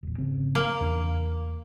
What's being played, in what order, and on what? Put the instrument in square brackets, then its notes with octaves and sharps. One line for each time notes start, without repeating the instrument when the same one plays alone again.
[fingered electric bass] E1 A#1
G#1 C#3 C4
[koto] A#3
[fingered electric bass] E2 D4